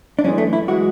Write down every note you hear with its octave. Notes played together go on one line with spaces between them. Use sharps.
D4
F#2 E3 G#3 C#4
A3
E4
E3 G#3 F#4